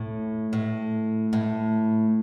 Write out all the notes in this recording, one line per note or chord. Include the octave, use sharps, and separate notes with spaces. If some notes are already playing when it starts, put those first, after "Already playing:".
Already playing: A2
A2
A2